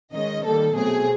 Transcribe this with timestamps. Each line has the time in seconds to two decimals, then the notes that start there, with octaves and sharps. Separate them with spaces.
0.12 D#3 G#3 C#4 D#5
0.44 D#3 G3 A#3 A4
0.74 B2 F#3 A3 C4 G#4